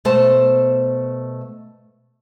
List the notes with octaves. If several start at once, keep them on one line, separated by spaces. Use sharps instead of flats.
B2 A3 C5 A5